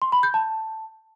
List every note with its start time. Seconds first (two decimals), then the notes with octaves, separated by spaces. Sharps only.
0.02 C6
0.12 B5
0.23 G6
0.34 A5